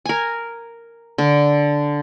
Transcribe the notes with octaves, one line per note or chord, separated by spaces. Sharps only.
A#4 G#5
D3